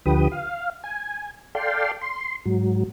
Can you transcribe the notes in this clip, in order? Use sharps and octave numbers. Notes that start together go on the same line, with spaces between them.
D2 D3 F3 G4 B4 D#6
F5
G#5
A4 D5 F5 G5 C6
C6
G#2 F#3